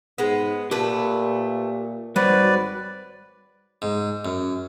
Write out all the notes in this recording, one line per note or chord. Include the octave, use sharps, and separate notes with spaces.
G#2 G#3 B3
A#2 A3 G4 B4 A5
G#1 F#3 G3 B4 C5 D5
G#2
F#2